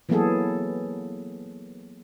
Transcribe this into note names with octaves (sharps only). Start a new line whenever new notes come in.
E3 F#3 A#3 B3 G#4 A4